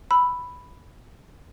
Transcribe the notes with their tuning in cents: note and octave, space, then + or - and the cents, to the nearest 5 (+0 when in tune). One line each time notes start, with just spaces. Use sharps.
B5 +0 E6 +0